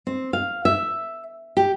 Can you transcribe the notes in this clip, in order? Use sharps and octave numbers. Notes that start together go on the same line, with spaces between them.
C4
F5
E5
G4